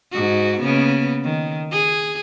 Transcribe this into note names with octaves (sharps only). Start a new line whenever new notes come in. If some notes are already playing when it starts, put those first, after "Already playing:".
G#2 F#4
C#3 A#3 B3
D#3
G#4